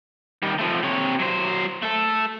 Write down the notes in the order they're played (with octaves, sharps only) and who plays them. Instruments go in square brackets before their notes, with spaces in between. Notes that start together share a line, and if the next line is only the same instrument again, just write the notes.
[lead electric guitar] D#3 G3
F3 A3
C3 C#5
F#3 C5
A3 A4